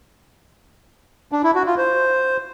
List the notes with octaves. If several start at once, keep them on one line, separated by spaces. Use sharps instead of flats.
D4
E4
F#4
F4
C5